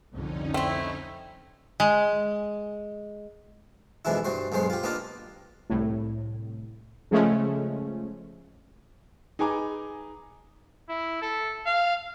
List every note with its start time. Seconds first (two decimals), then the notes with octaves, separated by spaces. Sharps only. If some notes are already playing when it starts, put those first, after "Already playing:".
0.11 C2 F2 D3 C#4 D#4
0.54 A3 C4 E4
1.80 G#3
4.05 F2 B2 E3 G#3 D4 E4
4.25 G2 G3 F#4 C5
4.52 B1 G2 G#3 B3 C5
4.70 F4 G4
4.83 A#3 B3 D4 D#4 F4 A#4
5.70 C2 A2
7.11 C#3 F3 G#3 A3 C#4
9.39 D#4 G#4 B4 G#5 A#5 D6
10.89 E4
11.22 A4
11.66 F5